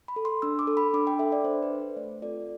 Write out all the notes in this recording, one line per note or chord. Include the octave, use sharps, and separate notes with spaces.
B5
A4
C6
D4 E6
D6
A4
B5
D4 D6
G5
A4 E5
D5
D4 C5
B4
A4
C5
A3 D5
C4 F4 A4 D5